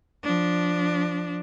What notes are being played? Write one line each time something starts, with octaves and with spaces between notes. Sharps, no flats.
F3 D4